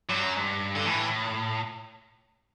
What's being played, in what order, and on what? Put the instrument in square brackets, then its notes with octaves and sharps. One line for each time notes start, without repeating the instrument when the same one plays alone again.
[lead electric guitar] G2 [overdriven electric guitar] F#3
[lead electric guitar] F#2
G2
[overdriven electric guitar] D3
[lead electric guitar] A2 [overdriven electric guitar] E3